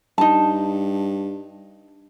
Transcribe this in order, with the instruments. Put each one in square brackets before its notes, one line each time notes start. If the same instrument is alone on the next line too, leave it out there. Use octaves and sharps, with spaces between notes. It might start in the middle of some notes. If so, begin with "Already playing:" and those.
[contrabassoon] G2 [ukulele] D#4 A5